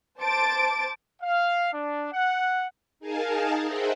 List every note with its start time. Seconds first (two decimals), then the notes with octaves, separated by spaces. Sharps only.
0.20 C5 A5 D6 A6 D7
1.22 F5
1.73 D4
2.12 F#5
3.00 D#4 G#4 A#4 F5 G#5 A5
3.63 G#4 C5 D#5 E5 F#5 G5